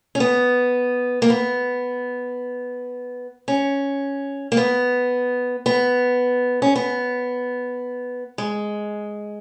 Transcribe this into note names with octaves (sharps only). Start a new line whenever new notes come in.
C#4
B3
A#3
B3
C#4
A#3
B3
B3
C#4
B3
G#3